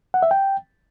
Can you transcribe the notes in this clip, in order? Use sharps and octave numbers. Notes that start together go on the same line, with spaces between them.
F#5
E5
G5